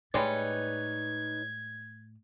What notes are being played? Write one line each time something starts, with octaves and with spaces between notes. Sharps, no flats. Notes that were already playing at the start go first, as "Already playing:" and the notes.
A2 G3 G#3 D#4 B4 C#5 D5 G#6